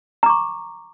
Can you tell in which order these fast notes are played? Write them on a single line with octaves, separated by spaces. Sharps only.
A#5 D6 C#6